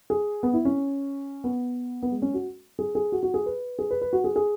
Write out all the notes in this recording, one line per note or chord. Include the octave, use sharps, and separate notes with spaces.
G#4
B3
E4
C#4
B3
B3
G#3
C#4
F#4
G#4
G#4
F#4
F#4
G#4
B4
G#4
B4
B4
F#4
G#4
G#4